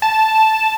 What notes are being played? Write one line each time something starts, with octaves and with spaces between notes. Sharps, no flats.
A5